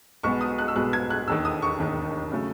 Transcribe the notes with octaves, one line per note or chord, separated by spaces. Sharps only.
B1 B2 G#3 B3 C#6
D#6
F#6
E6
B1 B2 G#3 B3 F#6
G#6
F#6
E1 D#2 D#3 E6
D#6
C#6
E1 D#2 D#3
C#3 F#3 A3